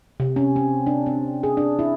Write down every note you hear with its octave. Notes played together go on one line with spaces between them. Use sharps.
C3
C#4
C4
D4
C4
G#4
D4
E4